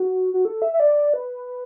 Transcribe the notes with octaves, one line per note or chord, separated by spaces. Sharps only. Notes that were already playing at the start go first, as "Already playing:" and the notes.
Already playing: F#4
F#4
A4
E5
E5
D5
B4